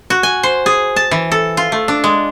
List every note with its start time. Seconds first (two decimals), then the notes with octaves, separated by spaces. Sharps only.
0.10 F#4
0.23 G#5
0.43 C5
0.66 G#4
0.96 A5
1.11 E3
1.32 A4
1.57 F4
1.72 A3
1.88 D4
2.04 G#3